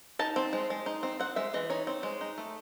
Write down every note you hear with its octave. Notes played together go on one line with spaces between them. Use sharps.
D#4 A5
C4
G#3
G#3
D#4
C4
C4 F#5
G#3 E5
E3 D#5
D#4 C#5
C4
G#3
D#4
A3